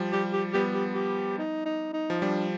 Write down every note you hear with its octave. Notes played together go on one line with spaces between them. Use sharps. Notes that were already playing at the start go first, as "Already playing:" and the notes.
Already playing: F3 G3
G3 G4
G4
G3 B3 G4
G4
G4
D#4
D#4
D#4
F3
G3 D4